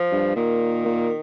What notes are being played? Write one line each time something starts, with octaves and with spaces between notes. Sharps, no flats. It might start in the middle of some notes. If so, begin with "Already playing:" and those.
Already playing: F3
G2
A#2 D#3
A#2